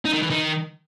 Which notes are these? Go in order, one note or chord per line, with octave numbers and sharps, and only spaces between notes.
D#4
D#3
E3
D#3